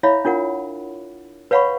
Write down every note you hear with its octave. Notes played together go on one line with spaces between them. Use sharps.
E4 C#5 E5 F5 B5
D4 F4 A#4 F#5
B4 C#5 F5 F#5 B5 C#6